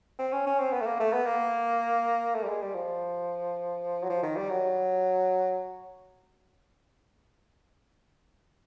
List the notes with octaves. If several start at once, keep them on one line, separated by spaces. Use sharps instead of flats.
C4
C#4
C#4
C4
B3
A3
A#3
A3
B3
A#3
A3
G3
G#3
G3
F3
F#3
F3
D#3
G3
F#3